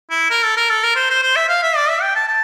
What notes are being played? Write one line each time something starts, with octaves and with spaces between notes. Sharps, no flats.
E4
A#4
A4
A#4
A4
A#4
C5
C5
C5
E5
F5
E5
D5
E5
G5
A5
A5